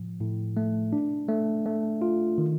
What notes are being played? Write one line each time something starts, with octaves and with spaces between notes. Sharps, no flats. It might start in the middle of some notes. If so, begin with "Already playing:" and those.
Already playing: A2 F3
A2
A3
D4
A3
A3
F4
D#3